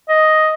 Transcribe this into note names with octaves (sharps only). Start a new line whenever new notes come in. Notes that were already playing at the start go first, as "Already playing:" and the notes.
D#5